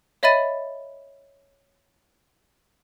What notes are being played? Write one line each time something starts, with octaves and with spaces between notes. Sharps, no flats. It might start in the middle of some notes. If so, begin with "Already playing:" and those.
C#5 D#5 E5 B5 A6 D#7